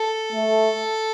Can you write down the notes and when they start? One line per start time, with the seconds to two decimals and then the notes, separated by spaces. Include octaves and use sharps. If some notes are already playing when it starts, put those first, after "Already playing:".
Already playing: A4
0.32 A3